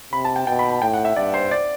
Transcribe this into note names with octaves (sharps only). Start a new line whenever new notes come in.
C3 B5
A5
G5
B2 G5
B5
B5
A2 G5
F#5
E5
G2 D5
C5
D5